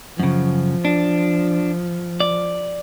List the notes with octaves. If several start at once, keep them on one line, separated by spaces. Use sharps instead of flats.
F#2 C#3 F3
D4
D5